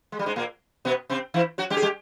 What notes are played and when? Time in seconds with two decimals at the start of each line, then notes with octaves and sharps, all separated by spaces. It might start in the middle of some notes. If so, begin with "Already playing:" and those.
0.12 G#3
0.19 G3
0.26 G#2 G#3
0.36 A#2 A#3
0.85 B2 B3
1.10 C3 C4
1.34 E3 E4
1.58 F#3 F#4
1.70 G3 G4
1.77 G#4
1.82 G3 G4